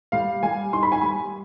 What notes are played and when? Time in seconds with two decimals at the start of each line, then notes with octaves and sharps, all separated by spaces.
0.12 G3 F5
0.43 G3 G#5
0.73 D#4 C6
0.83 B5
0.92 G#5
1.01 G3 B5